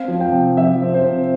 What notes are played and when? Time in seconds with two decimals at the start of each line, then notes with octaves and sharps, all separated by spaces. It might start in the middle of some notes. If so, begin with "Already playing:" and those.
Already playing: C4 F5
0.08 F3
0.21 G5
0.32 C3
0.57 F3 E5
0.82 C4
0.94 C5
1.06 C3